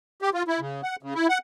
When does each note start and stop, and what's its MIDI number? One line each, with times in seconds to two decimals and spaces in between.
0.22 0.30 67
0.34 0.43 65
0.48 0.60 64
0.60 0.81 49
0.83 0.96 78
1.03 1.14 49
1.15 1.27 64
1.29 1.38 78